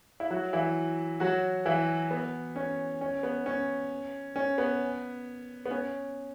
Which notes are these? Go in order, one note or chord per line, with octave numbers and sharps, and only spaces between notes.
E4
F#3 F#4
E3 E4
F#3 F#4
E3 E4
B3
C#4
C#4
B3
C#4
C#4
B3
B3
C#4